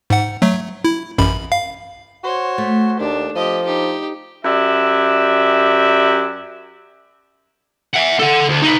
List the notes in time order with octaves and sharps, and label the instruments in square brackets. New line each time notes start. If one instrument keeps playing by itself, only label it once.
[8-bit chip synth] G#2 F#5
F#3 A3
E4
A1 F#2 B5
F5
[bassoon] F#4 [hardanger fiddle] C5 C#5
[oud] A3
[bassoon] D#2 [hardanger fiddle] D4
[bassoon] F3 [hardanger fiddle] G4 D#5
[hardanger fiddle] D#4 G4
[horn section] F#2 G4 D5 E5
[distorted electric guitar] E5 F#5
A4 F#5
D2
D#4 B4